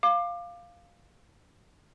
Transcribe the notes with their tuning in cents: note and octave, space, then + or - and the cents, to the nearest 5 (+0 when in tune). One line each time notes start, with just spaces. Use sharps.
F5 +0 D6 +25